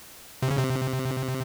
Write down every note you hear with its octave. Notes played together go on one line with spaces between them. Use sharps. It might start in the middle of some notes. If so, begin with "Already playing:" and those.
C3
C#3
C3